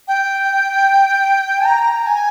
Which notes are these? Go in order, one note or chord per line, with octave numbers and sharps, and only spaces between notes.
G5
A#5
G#5